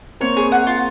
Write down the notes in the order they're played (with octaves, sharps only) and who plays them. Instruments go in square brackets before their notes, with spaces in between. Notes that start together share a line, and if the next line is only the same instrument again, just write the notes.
[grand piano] A#3 C4 [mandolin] C#5
[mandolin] G#4
F#5
F4